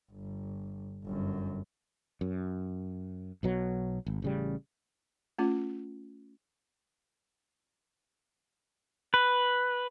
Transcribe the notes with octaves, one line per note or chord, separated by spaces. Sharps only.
G1
G1 F#2
F#2
B1 B2 F#3
G#1
A1 C#3 G3
A3 C#4 F4
B4